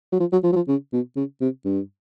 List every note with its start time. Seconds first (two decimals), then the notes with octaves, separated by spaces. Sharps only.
0.12 F#3
0.20 F3
0.32 F#3
0.44 F3
0.52 F#3
0.56 F3
0.68 C#3
0.93 B2
1.16 C#3
1.41 C3
1.65 G2